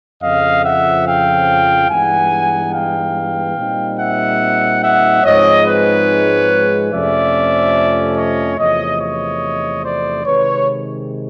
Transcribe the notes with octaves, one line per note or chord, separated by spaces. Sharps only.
F2 C#3 F3 D#5 F5
E5 F#5
F5 G5
G2 E3 G#3 B3 D#4 F#5 G#5
F5 G5
A#2 G3 C4 D#4
E5 F#5
E5 F#5
G#2 F3 G#3 C4 D#4 C#5 D#5
B4 C#5
F2 C3 F3 A3 C#4 D5 E5
C#5 D#5
E2 C3 F3 A3 C#5 D#5
C#5 D#5
C5 D5
C3 D#3 G#3 B4 C#5